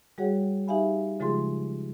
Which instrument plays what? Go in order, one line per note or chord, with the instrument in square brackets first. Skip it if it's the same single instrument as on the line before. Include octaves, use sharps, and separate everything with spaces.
[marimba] G3 F#4 G#4 C#5 F#5
D#4 G4 E5 F5 G#5 B5
C#3 F3 G#3 F4 G#4 C6